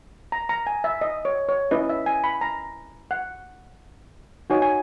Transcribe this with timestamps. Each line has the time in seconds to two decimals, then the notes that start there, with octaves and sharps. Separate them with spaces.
0.32 A#5
0.49 A#5
0.67 G#5
0.84 E5
1.01 D#5
1.25 C#5
1.49 C#5
1.71 C#4 E4 B4 D#5
1.89 E5
2.06 G#5
2.24 B5
2.41 A#5
3.11 F#5
4.50 D#4 F#4 C#5 G#5
4.62 G#5